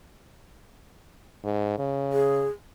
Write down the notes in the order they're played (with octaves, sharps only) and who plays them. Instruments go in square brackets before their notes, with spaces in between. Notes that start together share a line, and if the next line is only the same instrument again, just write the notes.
[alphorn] G#2
C#3
[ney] G#4